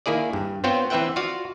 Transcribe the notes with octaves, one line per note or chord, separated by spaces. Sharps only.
D#3 A#3 E4 G#4 D5
G2
B3 C4 F4 C5 C#5 G5
E3 C4 B4 E5 F#5 G5
F4 F#4 D5 F5